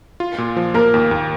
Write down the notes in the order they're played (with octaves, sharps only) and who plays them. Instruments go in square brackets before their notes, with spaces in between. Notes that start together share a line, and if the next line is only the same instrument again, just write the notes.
[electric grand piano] F4
A#2
F3
[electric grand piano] A#3 [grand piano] A#4
[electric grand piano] D#2
D#2